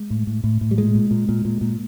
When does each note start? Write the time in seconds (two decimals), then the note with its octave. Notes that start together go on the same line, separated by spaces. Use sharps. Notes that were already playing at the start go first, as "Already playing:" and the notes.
Already playing: G#3
0.10 A2
0.27 A2
0.44 A2
0.61 A2
0.71 G3
0.78 A#2 G#3
0.95 A#2
1.11 A#2
1.29 A#2
1.45 A#2
1.61 A#2